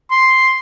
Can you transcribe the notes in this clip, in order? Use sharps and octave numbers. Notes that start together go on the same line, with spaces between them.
C6